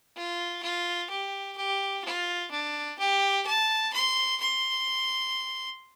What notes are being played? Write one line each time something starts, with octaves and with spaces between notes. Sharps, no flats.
F4
F4
G4
G4
F4
D4
G4
A5
C6
C6